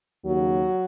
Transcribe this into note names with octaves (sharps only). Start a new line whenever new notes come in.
D#2 C#3 F#3